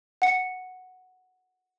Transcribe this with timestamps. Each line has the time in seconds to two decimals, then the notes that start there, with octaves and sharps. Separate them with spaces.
0.22 F#5 C#7